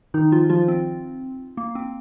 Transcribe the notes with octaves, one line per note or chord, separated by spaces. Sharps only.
D#3 D#4
F3 F4
F3 F4
C4
A#3
C4